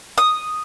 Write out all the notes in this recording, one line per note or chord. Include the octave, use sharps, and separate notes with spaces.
D#6